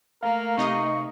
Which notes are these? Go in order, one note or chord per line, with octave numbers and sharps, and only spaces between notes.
A3 A#3 A#4 F5
C3 D#4 D#5 C#6